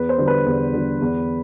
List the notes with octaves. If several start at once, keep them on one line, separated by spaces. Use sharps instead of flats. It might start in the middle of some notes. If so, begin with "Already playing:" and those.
Already playing: E2 B4
C5
D3 G3
B4
E2
D3 G3
E2